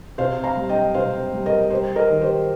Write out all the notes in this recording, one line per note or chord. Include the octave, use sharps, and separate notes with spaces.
C3 C5 F5
F5 A#5
G3
D#5 G5
C3 C5 F5
G3
A#4 D#5
G3 G4 C5
A#4 D#5
D#3
G4 C5